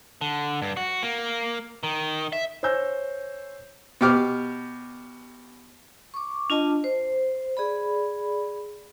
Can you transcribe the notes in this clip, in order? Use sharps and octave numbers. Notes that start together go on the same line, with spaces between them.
D3
G2
F#4
A#3
D#3
E5
C5 C#5 G#5 E6 G6 A#6
B2 G4 D6 F6
C#6 D6
D4 F4 D#5 A5
C5
G#4 D5 B5